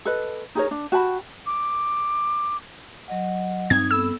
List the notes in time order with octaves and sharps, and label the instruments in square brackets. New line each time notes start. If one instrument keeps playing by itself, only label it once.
[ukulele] A4 B4 D#5
D#4 G#4 A#4 C#5
D4
F#4 G5 A5 B5
[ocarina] D6
[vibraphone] F#3 D#5 F#5
[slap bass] G2 C4 [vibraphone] D#4 D#6 [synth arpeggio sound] G#6
[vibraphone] B3 A4 [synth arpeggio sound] E6